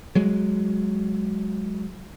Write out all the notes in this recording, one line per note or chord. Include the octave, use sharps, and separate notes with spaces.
F#3 G#3